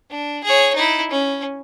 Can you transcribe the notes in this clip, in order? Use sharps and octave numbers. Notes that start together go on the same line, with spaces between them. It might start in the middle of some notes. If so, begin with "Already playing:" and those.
D4
G#4 C#5
D#4 E4
C#4